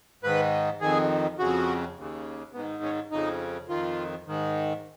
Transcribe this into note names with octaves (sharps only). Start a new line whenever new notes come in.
G#2 D#3 B4
F2 D#3 G#4
F2 C#3 F#4
D#2 C#3
G#2 D#3 B3
C#4
F2 C#3 D#4
F2 D#3 F4
G#2 D#3